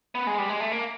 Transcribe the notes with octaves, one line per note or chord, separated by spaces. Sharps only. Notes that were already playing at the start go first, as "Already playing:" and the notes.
B3
G#3
G3
G#3
A3
A#3